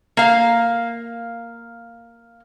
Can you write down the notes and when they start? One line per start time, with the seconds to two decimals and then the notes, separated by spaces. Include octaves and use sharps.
0.17 A#3 F5